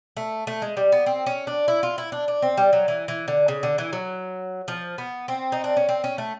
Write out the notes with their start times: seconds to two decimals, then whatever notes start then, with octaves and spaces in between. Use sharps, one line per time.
0.17 A3
0.47 A3
0.62 G#3
0.77 G3
0.92 B3
1.06 C4
1.27 C#4
1.47 D4
1.68 E4
1.83 F4
1.98 E4
2.12 D4
2.28 D4
2.42 C4
2.57 G3
2.73 F#3
2.88 E3
3.08 E3
3.28 D3
3.48 C#3
3.63 D3
3.78 E3
3.93 F#3
4.68 F3
4.98 B3
5.28 C4
5.52 D#4
5.64 D4
5.77 C#4
5.89 C4
6.04 C#4
6.18 A3